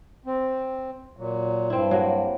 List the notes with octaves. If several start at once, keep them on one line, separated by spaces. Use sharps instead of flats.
C4
A#2 F#3
G2 C4 E4
F#3 A#3